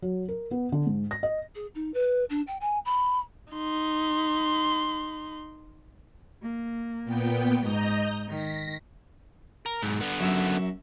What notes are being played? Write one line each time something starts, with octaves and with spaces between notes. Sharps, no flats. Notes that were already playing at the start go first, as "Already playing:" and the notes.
F#3
A#4
B3
D3
G#2
A#6
D#5
G#4
D#4
B4
D4
G5
G#5
B5
D#4 C6
A#3
A#2 B3 G5
G#2 D#5 A#5 G6
D#3 A#6 B6
A#4
B1 G#2
D3 B3
F#2 E5 A#5